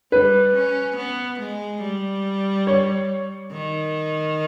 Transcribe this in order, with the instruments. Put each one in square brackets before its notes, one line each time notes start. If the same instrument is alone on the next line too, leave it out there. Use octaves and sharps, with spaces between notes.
[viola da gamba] G3 [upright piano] B4
[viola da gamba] C#4
B3
G#3
G3
[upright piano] C#5
[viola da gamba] D#3